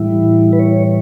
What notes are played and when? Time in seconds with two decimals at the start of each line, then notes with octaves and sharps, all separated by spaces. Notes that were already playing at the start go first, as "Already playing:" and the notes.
Already playing: A2 E3 G3 E4
0.53 B4
0.59 C#5